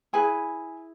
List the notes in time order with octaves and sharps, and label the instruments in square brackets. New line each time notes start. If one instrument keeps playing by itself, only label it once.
[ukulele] E4 G#4 B4 G#5